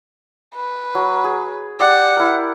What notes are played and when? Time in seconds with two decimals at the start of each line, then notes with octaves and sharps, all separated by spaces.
0.56 B4
0.95 F#3
1.24 G#4
1.80 G4 D5 F#5
2.17 E4 A#4